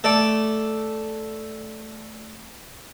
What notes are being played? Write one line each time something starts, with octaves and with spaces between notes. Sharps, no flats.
A3 D5